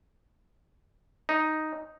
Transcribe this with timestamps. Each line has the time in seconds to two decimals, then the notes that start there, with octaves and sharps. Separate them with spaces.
1.29 D#4